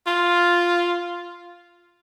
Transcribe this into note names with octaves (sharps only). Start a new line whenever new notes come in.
F4